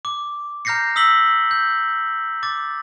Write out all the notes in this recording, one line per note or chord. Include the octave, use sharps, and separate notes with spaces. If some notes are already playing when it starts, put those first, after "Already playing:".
D6
A#5 F6 G6 A#6 C7 C#7
D#6 E6 B6 F#7 G7
G6
D6 A6